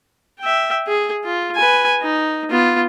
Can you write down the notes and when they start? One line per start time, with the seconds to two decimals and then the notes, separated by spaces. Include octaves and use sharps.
0.40 E5 G5
0.87 G#4
1.24 F4
1.56 B4 G#5
2.01 D#4
2.50 B3 F4